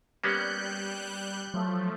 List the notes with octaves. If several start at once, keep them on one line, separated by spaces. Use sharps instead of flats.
G3 A#3 B3 C#4 F#6 G6
F3 F#3 A3